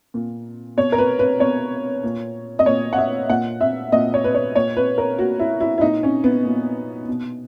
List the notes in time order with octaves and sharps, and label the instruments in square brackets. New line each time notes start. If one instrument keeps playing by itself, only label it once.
[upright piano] A#2
B2 C#5
A#4
B4
B4
B2 C#5
A#2
D#5
A#2 C#5
F#5
E5
A#2 F#5
E5
A#2 D#5
C#5
B4
C#5
A#2 C#5
B4
A#4
A#2 F#4
E4
E4
E4
A#2 D#4
C#4
B3
A#2
B2